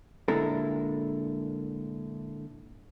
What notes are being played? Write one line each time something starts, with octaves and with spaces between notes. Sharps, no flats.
A#2 D3 G#3 E4 A4 A#4